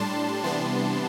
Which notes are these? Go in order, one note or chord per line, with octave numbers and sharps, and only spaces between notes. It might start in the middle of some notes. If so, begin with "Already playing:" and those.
Already playing: A2 G3 D4 A5 C6
C3 E3 G3 B3 D4 A5 C6